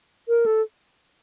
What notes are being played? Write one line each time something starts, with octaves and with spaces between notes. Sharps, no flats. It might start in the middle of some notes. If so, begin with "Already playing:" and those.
A#4
A4